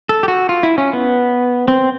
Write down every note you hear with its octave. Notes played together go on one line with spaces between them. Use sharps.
A4
G4
F#4
F4
E4
C#4
B3
C4